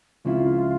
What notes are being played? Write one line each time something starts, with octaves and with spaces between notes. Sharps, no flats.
C#2 C#3 F3 C4 E4 F4